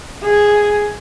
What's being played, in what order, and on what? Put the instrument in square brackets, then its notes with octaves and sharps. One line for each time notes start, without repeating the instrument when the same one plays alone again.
[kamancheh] G#4